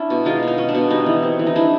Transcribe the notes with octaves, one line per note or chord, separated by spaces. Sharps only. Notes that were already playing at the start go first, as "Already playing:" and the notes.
Already playing: C#4 D4 E4
B2
G#3 D#4 F4
B2 D#4
C#4
D4
B2
G3 D#4
E3
C4
E3
D#4
G3 D4 E4